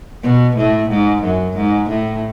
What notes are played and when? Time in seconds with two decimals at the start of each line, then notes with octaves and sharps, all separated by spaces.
0.23 B2
0.57 A2
0.89 G#2
1.23 F#2
1.56 G#2
1.89 A2